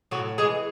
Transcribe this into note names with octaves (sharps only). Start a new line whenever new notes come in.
A2 F#3 F#4
E3 G#3 G#4